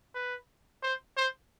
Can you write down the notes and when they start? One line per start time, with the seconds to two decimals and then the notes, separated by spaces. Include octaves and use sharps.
0.15 B4
0.83 C5
1.17 C5